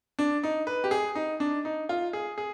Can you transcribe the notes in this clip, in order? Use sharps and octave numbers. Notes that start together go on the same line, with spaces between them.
D4
D#4
B4
G4
G#4
D#4
D4
D#4
F4
G#4
G#4